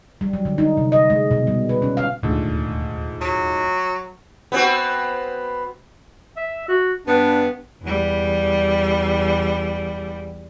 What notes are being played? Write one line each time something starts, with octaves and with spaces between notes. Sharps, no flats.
G3
F#3
D3
D#4
C3
D#5
G#3
B2
G3
B4
C#4
F5
D#1 D2 G#2 A3 D4 F4
F#3
B3 C4 F#4
E5
F#4
G2 B3 D4
E2 G3